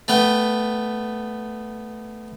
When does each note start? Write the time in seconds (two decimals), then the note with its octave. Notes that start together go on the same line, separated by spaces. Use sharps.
0.08 A3 B3 G5